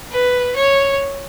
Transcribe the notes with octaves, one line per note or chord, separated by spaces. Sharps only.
B4
C#5